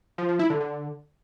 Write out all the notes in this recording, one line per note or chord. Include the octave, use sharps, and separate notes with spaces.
F3
F3
E4
D3
D3